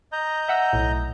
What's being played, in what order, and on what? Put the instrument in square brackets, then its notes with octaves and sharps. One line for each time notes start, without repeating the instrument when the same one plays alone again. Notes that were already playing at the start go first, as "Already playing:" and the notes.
[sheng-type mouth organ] D#5 A#5 G6
[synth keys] E5 F#5 E6
B1 A2